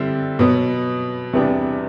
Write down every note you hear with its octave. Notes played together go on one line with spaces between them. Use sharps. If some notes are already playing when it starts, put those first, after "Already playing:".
Already playing: D3 G3 C4 E4
B2 F#3 B3
E2 C3 G3 B3 D4